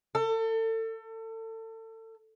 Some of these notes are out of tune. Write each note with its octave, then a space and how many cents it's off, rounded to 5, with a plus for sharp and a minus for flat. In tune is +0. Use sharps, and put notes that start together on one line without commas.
A4 +30